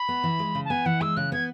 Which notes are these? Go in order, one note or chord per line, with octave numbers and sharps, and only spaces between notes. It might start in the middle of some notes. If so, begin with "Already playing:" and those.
Already playing: B5
B3
E3
G#3
C#3
A5
B3 G#5
E3 F#5
G#3 E6
C#3 F#6
B3 G#6